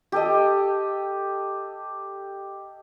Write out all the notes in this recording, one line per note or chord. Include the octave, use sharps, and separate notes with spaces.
G4 A4 D#5